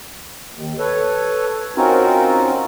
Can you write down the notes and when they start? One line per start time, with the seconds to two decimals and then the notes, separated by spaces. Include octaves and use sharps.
0.53 D#2
0.79 A4 B4 C#5
1.76 C4 C#4 D#4 F4 F#4 A#4